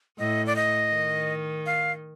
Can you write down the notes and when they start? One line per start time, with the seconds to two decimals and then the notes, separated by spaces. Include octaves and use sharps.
0.19 A2 D#5
0.47 D5
0.56 D#5
0.93 D#3
1.66 F5